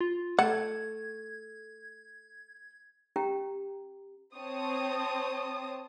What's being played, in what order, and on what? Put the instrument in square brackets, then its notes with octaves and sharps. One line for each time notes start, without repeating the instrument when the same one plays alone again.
[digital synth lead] F4
[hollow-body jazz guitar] A3 [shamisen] F#5 [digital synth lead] G#6
[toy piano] C#4 G4 G5 A#5
[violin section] C4 C#5 A5 D#6